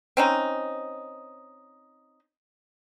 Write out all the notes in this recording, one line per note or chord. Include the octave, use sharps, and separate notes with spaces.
C4 C#4 D#4